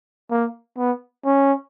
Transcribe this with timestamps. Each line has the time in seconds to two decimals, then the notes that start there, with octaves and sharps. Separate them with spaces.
0.31 A#3
0.78 B3
1.25 C#4